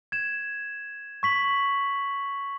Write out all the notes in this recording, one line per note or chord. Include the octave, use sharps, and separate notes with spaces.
G#6 E7
C#6 B6 F#7